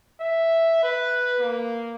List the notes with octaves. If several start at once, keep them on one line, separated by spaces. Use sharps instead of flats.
E5
B4
A#3